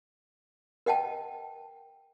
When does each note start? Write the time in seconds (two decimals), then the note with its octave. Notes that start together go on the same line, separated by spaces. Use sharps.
0.86 A#4 D#5 F#5 G5 A5